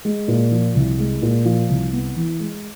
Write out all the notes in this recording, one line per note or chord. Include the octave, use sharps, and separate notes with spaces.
G#3
A#2
F3
C2
G#3
A#2
F3
C2
B3
E3
G#3